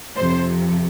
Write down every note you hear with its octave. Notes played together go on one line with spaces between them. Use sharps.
F2 C3 F3 C5